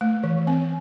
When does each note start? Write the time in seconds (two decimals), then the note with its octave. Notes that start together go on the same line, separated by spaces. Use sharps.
0.01 A3
0.24 E3
0.47 C4